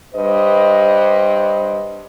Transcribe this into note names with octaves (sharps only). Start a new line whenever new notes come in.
G2 B4 C5 D#5